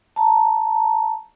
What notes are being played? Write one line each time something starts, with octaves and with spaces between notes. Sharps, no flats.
A5 A#5